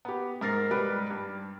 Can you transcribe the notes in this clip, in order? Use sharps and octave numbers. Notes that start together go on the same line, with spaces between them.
B3 G4
G#2 A#4 F6 A6 A#6 C7
G#2 G3 G4 B4 D7
G2